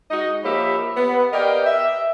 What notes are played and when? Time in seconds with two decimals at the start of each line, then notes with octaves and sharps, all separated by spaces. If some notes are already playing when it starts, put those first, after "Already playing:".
0.10 G#3 D#4 F#4 D#5
0.44 F3 A#3 G4 C#5 E5 B5
0.97 B3
1.33 G4 A#4 D5 D#5 F5 G5
1.66 E5